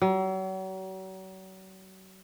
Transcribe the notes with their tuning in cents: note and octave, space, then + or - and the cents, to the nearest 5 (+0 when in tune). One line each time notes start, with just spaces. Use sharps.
F#3 +40